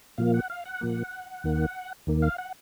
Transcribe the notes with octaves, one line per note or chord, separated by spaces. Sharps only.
A#2 F3 A#3 F5
F#5
F5
F#5
A#2 F3 A#3
D#2 D#3 A#3
D#2 D#3 A#3
F5
F#5